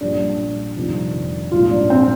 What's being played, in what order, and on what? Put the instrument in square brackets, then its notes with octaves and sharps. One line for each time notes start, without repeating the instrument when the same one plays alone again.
[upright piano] A#1 A#2 G3 D4
F1 F2 D#3 G3
A#1 G#2 G3 F4
D4
C4